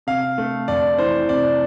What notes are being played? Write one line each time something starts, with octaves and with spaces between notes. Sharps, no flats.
C3 F5
A3
F2 D5
E3 C5
C3 D5